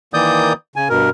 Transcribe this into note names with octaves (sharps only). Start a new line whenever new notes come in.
D#3 E3 A#3 D5 D#6 G6
C#3 G#5
G2 B2 A#4